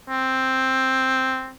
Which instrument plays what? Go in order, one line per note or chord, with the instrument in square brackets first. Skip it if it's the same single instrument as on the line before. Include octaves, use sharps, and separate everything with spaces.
[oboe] C4